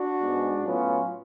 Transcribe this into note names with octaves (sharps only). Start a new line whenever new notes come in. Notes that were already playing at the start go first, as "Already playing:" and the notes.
Already playing: D4 F#4
G#2 G#3 B3
A2 F#3 B3 C#4 F4